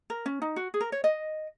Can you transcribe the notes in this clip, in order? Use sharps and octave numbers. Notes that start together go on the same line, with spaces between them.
A#4
C#4
D#4
F#4
G#4
A#4
C#5
D#5